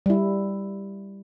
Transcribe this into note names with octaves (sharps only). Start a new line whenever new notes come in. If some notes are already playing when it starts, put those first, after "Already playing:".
G3 E4